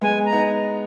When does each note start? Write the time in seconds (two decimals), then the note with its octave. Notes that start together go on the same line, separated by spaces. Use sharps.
0.01 G#3 B3 G#5
0.25 A#5
0.32 B3 D#4